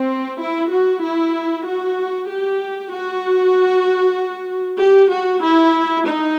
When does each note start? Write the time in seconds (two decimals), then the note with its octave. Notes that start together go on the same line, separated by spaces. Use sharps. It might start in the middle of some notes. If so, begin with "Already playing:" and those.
Already playing: C4
0.40 E4
0.71 F#4
1.04 E4
1.66 F#4
2.29 G4
2.93 F#4
4.80 G4
5.11 F#4
5.43 E4
6.07 D#4